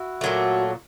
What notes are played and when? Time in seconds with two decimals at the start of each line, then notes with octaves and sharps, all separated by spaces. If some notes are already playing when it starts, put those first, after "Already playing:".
Already playing: E4 F#4
0.21 A#2 F#3 A3